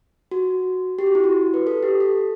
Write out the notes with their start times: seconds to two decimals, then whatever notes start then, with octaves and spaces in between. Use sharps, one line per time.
0.31 F#4
0.99 G4
1.06 F#4
1.15 E4
1.24 F#4
1.54 B4
1.67 A4
1.83 G4
2.00 A4